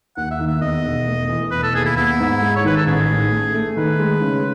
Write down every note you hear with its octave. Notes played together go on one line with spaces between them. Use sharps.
D#2 F#5
E5
D#3
E5
E2 D#5
E1
A3
E3
E1 B4
A4
D#2 G#4
E4
B3 E4
G#2
G#3
C#5
D#3 B4
A4
A1 G#4
A2
A3
A3
D#3 B4
G#3
C#3